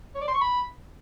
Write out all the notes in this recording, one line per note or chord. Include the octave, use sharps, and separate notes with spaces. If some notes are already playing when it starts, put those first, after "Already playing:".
C#5
D5
C6
C#6
B5